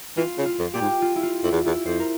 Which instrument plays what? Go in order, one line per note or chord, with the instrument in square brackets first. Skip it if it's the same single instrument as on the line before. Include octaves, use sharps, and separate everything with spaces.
[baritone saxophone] E3 [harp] F4
[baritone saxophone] C#3
[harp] F4
[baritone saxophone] F2
[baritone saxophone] A#2 [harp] G4
[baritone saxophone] G#2
[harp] F4
E4
F4
[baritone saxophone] F2 [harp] E4
[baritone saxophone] E2
[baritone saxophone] E2 [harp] E4
[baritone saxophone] F2 [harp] C5
[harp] A#4